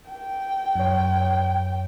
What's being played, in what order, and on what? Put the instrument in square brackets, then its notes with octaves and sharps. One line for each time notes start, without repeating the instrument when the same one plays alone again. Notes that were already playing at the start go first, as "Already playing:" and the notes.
[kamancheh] G5
[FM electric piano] F#2 C#5